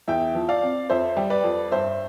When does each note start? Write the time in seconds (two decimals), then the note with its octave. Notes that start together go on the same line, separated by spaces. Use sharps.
0.08 E2 E5 G5
0.35 F3
0.49 D5 F5
0.62 C4
0.90 F2 C5 E5
1.17 G3
1.30 B4 D5
1.44 F2
1.71 G2 C5 E5